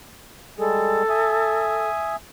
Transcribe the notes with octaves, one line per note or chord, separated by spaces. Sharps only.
G3 G#3 G#4 A4
E5 G#5 D#6